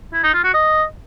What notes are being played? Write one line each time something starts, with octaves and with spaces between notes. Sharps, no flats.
E4
D#4
F4
F#4
D#5